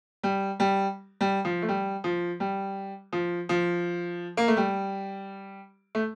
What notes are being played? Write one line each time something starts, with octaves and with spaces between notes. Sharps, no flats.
G3
G3
G3
F3
A3
G3
F3
G3
F3
F3
A#3
A3
G3
A3